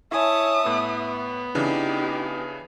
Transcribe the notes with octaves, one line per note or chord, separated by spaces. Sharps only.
E4 C#5 E5 G#5 A5 D#6
A2 B3
C#3 E3 D4 D#4 G4